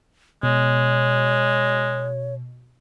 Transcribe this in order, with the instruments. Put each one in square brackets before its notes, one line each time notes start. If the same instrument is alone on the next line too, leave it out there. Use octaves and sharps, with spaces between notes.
[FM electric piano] B2 [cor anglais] G#3 [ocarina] C#5